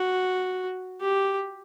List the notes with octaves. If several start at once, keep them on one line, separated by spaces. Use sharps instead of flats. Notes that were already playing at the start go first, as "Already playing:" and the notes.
Already playing: F#4
G4